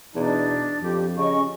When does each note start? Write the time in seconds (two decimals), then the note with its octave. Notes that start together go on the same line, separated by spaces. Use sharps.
0.16 E2 B2 D4 D#4 A5
0.82 F2 F3 G4
1.17 C#3 C#4 D#5 C#6